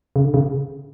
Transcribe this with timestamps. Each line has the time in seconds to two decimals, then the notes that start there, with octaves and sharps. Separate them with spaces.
0.16 C#3
0.24 D3
0.34 C#3